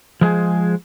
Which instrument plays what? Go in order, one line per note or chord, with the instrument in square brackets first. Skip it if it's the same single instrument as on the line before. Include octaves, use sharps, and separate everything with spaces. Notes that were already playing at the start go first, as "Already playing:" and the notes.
[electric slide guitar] F3 G#3 G#4 C5